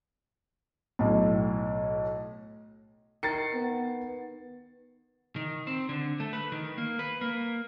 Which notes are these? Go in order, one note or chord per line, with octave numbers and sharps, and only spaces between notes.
B1 A2
D#3 A6 C7 C#7
B3
D#3
C4
D3
A3
B4
D#3
A#3
B4
A#3